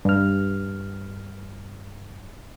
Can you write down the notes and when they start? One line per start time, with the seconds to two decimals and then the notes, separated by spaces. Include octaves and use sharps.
0.05 G2 F6